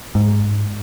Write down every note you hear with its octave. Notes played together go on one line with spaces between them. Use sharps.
G#2